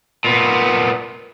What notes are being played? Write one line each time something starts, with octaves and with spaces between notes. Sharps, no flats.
A#2 B3